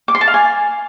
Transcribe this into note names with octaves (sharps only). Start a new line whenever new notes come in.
D6
C6
A5
F5
G#5